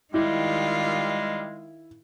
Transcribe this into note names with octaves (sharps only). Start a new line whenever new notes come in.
D#3 G3 G#3 E4 F4